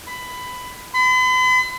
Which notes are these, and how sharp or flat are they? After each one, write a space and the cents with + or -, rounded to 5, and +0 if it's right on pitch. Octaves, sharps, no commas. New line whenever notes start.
B5 +15
B5 +45